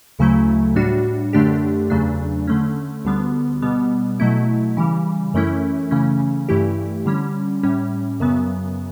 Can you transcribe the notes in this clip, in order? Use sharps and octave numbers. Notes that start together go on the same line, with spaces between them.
D2 C#3 F#3 A3 E4
A2 G3 D4 F#4
F#2 D3 A3 D4 G4
E2 C#3 F#3 A3 D4
D3 A3 C#4
D2 D3 G3 B3
B2 G3 B3
B2 F#3 A3 E4
C#3 E3 G3
F#2 E3 A3 C#4 E4
C#3 E3 A3 C#4
G2 E3 A3 E4 G4
D3 G3 C#4
A2 G3 C#4
F#2 C#3 F#3 B3